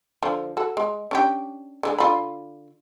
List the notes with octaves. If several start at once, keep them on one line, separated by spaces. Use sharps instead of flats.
D3 F3
F#4 A4
G#3
C#4 D4 G4
D3 F3 G#3
D3 F4 B5